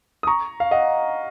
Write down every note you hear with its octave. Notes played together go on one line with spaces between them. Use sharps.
D#6
A#5 C#6
F5
D#5 F#5